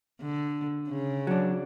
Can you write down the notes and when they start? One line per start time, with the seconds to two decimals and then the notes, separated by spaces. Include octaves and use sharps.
0.22 D3
0.89 C#3
1.27 F#3 D4